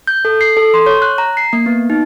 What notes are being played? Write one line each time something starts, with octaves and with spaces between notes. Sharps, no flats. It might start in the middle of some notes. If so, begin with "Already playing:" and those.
G6
A4
C7
A4
C6
C#5
F#6
A#5
C7
A#3
B3
D#4